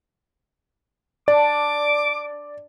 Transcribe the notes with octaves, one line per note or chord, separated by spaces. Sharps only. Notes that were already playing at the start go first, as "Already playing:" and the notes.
D4 D5 D6